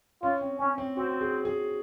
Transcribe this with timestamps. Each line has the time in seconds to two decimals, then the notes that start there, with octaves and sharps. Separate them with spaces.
0.23 C#4 F4
0.41 C4
0.59 C4 C#4
0.78 C4
0.96 C4 F#4
1.21 G#4
1.45 G#4